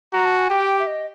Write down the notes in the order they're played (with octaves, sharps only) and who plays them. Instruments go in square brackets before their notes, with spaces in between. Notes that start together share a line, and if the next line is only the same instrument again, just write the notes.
[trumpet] F#4 [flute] A#5
[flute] A5
G#5
[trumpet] G4 [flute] G5
[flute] E5
D#5